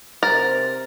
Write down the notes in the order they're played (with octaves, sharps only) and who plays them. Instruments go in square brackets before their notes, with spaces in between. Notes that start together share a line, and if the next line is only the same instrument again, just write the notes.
[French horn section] C3 C5 [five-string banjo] A#4 [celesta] A6